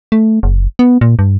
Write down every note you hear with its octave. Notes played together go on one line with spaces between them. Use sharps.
A3
F#1
B3
A#2
G2